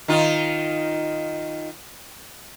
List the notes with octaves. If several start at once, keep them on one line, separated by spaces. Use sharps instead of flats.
D#3 D#4 F4